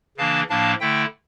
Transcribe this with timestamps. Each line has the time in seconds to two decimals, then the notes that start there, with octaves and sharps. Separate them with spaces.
0.17 C#3 E3 A#3 D4 F5 A5
0.49 A2 F3 A#3 D4 F5 A5
0.80 D3 A3 E4 E5 G5